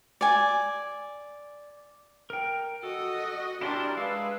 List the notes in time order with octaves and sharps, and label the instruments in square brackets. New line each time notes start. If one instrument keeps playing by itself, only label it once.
[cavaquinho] D5 G#5
[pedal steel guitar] A#4 G5
[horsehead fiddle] F#4 D#5 [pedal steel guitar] A4
[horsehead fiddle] D4 A#4 [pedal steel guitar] E4 G4 C6
[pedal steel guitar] G#3 F5 E6 [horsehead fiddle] B4